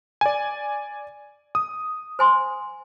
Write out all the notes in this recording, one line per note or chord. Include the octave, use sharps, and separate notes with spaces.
D5 G#5
D#6
C5 G#5 C6